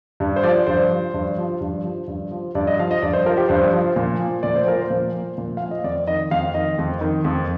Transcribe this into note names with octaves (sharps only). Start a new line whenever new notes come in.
G2
C5
F3 D5
G2 C5
F3
G2
F3
G2
F3
G2
F3
G2 D5
D#5
F3 F5
D#5
G2 D5
C5
F3 A#4
G4
G2 C5
F3
A#2
F3
A#2 D5
C5
F3 A#4
C5
A#2
F3
A#2
F3 F5
D#5
F2 D5
D#3 D#5
F2 F5
D#3 D#5
F2
D#3
F2